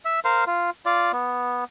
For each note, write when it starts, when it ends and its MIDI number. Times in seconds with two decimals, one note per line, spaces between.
0.05 0.20 76
0.25 0.44 70
0.25 0.44 72
0.25 0.44 77
0.47 0.70 65
0.86 1.12 65
0.86 1.12 74
1.13 1.64 59